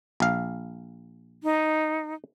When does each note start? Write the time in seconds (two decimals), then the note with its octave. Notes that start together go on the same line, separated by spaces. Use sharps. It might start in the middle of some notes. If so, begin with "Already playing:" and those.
0.20 A#1 F5
1.43 D#4